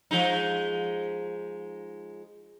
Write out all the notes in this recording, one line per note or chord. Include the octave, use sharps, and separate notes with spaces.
F3 G#3 D#4